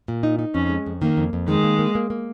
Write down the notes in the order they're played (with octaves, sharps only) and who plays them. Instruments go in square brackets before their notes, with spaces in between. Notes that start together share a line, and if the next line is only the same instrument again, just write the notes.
[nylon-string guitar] A#2
D#4
D#4
[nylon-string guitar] F2 [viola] C#4
[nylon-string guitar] G#3
F2
[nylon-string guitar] D#3 [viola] A#3
[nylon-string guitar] F2
F2
[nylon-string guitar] D#3 [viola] G#3
[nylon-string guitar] A#3
A#3
A#3
A#3